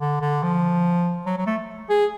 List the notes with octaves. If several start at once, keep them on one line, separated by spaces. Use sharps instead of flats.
D3
D3
F3
F#3
F#3
A3
G#4